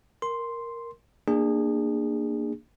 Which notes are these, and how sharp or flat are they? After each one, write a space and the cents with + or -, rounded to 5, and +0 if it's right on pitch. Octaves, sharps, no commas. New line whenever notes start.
A#4 +0 C6 +0
A#3 +0 D4 +25 G#4 -20